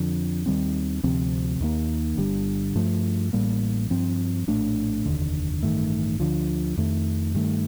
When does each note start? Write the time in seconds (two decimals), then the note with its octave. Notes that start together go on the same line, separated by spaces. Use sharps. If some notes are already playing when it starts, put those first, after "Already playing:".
Already playing: F2 D3 F3
0.46 D#2 D#3 G3 C4
1.03 D2 C3 F3 C4
1.60 D#2 D#3 A#3
2.18 G1 G2 D3 G3
2.75 G2 F3 A3
3.33 A1 A2 G3 A#3
3.90 G2 F3 C4
4.47 A#1 A2 A3 D4
5.05 F1 D#2 D3
5.63 A1 G2 D#3 A3
6.20 D2 D3 F3
6.77 F2 D#3 A3
7.34 G2 D#3 A3